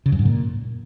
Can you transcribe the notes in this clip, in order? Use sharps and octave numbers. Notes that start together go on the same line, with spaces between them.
C#3
F#2
G#2
A#2